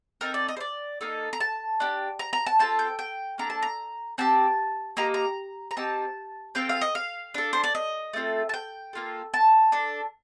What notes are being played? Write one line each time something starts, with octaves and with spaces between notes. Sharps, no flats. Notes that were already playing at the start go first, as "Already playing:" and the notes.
C4 D#4 A4 A#4
D5
D#5
C5
D5
A#3 D#4 A4
A#5
A5
D4 G4
A#5
A#5
A5
C4 F4 A4 A5
G5
G5
A#3 D4 A4 A#5
A5
A#5
C4 G4 A5
A#3 D#4 G4 A#5
A#5
A#5
C4 D#4 G4 A5
C4 F4 A4 G5
F5
D#5
F5
D4 A4
C5
D5
D#5
A3 C4 F4 A4
A5
G5
A#3 F4 A4
A5
D4 A4